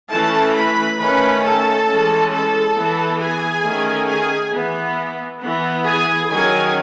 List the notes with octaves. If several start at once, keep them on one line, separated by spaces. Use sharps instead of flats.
E3 A3 C#4 A4 A5
B4 B5
D#3 A3 C#4 B4 B5
A4 A5
E3 G#3 C#4
A4 A5
E3 B3
G#4 G#5
D#3 A3 C#4
G#4 G#5
E3 B3
E3 B3
G#4 G#5
D#3 F#3 C#4 G#4 G#5